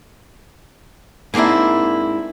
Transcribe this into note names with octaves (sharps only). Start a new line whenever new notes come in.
G#2 A#3 C4 D4 E4